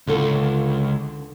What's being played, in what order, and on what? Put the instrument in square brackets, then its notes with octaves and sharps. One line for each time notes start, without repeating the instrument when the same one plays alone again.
[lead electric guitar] C#2 [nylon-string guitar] D3 A4